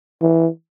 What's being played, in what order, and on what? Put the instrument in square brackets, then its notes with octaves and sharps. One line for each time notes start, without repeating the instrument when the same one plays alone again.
[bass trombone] E3